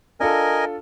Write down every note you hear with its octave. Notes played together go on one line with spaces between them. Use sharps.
D4 F4 A4 A#4 D#5 G#5